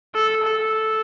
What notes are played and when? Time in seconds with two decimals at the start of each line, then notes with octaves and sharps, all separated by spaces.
0.15 A4
0.44 A4